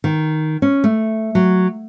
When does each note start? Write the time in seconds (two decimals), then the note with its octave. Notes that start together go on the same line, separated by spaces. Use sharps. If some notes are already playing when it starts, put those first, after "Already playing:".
0.04 D#3
0.62 C#4
0.84 A3
1.35 F#3